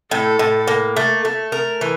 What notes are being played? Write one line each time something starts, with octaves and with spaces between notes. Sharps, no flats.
A2 A4
A2
A#3
A3
A3
A#4
E3